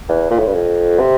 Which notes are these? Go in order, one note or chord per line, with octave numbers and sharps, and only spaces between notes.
E2
A#2
A2
G2
F2
C3